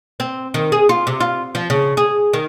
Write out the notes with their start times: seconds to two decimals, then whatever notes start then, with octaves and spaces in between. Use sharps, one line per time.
0.20 C4
0.54 D#3
0.72 G#4
0.89 F4
1.07 C3
1.20 F4
1.55 F3
1.70 C#3
1.97 G#4
2.33 D#3